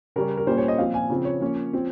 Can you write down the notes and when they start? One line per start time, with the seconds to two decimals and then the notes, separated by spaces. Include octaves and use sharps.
0.16 C#3 G3 C#4 A#4
0.37 A#4
0.47 A#2 G3 A#3 C#4 C5
0.58 C#5
0.68 D#5
0.78 A#2 F3 C4 F5
0.94 G#5
1.10 C#3 F3 C4
1.25 C#5
1.41 F3 A#3 C#4
1.73 F3 C4